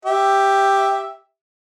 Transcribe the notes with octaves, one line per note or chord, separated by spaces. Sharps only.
G4 E5